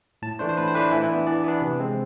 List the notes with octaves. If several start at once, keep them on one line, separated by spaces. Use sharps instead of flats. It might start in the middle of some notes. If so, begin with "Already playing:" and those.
A2 A5
E3 A3 D4 C5
C5
A2 B4
C5
E3 A3 D4 B4
E3 E4
E4
B3 D4
E3 D5
B3 D4
C3
G#3 C4